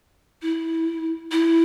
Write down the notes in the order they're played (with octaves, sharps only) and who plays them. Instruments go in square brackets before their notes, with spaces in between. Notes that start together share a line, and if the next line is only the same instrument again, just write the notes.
[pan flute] E4
E4